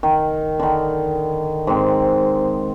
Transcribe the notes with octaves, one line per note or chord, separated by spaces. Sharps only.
D#3
D3 D#3
G#2 C4